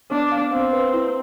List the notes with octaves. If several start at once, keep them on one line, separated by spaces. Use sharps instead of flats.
B3 D4
F5
C4 F5
B4
E4